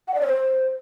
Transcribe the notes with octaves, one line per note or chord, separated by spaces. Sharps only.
F#5
D5
C#5
C5